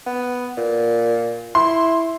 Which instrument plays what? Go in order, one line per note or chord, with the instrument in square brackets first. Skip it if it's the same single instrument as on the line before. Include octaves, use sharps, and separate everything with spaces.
[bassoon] B3
A#2
[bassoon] E4 [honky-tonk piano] C6